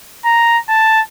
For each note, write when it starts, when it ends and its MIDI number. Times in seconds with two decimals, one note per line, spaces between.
0.25 0.58 82
0.69 1.01 81